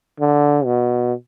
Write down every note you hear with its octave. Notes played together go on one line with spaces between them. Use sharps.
D3
B2